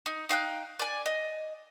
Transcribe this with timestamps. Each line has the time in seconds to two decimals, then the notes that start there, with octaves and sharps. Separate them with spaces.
0.06 D#4
0.29 D#4 F5 G5 F#6
0.79 D5 G#5
1.06 D#5